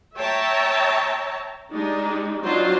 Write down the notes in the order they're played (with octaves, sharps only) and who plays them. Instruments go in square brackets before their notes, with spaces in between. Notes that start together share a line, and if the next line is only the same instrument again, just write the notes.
[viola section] C#5 E5 G5 A5 A#5
G#3 D4 D#4 G4
F#3 C4 D4 D#4 F4 C5